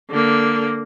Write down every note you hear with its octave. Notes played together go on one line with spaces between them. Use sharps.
D3 A#3